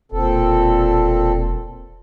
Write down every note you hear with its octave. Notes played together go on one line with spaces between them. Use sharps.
E1 A#2 C4 A4